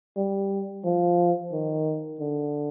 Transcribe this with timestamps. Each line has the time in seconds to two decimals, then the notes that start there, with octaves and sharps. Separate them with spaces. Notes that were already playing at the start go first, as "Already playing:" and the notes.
0.17 G3
0.84 F3
1.52 D#3
2.20 D3